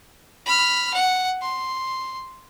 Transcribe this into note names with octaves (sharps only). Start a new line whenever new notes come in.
B5 F6
F#5
C6